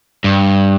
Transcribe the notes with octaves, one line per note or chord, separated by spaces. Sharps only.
G2